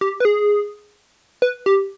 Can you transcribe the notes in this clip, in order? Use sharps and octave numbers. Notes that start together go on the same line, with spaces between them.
G4
B4
G#4
B4
G4